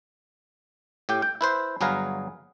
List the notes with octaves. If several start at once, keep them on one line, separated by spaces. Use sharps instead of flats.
A2 G4 G5
G5
E4 B4 C5
G1 F#3 G#4 B4 F5 A#5